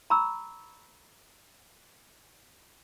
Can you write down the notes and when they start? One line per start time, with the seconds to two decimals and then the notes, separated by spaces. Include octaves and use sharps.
0.10 A#5 B5 C#6 E6